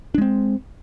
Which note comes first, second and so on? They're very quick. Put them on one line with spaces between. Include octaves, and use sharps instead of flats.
D4 G#3 C4